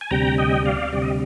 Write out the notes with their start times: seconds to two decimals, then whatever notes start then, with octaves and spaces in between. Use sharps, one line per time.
0.01 G#5
0.11 D2 C3 G3 G5 A#5
0.38 D#5 G5
0.65 D5 F5
0.93 D2 C3 G3 D5
1.02 D#5